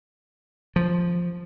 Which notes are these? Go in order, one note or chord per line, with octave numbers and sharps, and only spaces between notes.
F3